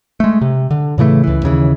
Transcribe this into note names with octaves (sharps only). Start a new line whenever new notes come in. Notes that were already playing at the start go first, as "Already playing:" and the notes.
G#3 A3
C3
D3
A2 C#3 E3 A3
C#2 E3
D#2 C#3 E3